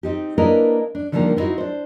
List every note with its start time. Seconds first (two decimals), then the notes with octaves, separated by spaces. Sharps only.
0.03 C4 D#4 G4
0.38 A#3 D4 E4 A#4 B4 D#5
0.95 D4
1.12 D3 D#3 F3 G3 A3 A#3
1.36 B3 C4 D#4 E4 F#4
1.58 D4 C5